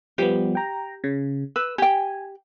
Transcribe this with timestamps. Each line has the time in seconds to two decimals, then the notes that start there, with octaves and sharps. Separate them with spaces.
0.18 F3 G3 B3 G4
0.55 G5 A#5
1.04 C#3
1.56 B4 E6
1.78 G4 G5 G#5